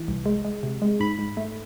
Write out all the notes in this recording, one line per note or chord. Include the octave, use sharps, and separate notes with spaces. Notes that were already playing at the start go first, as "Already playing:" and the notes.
Already playing: E3
C2
G#3
G#3
C3
G#3
G#2 B5
G#2
A3